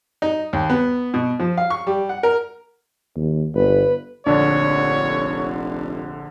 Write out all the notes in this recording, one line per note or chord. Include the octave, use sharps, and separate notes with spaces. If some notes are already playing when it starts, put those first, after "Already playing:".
D#4
D#2
B3
B2
F3
F5
C#6
G3
F#5
A#4
D#2
G1 B4
F1 A#1 D3 D4 C#5